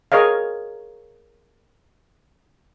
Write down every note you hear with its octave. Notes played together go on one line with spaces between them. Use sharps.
G#4 A#4 C#5 D#5 F5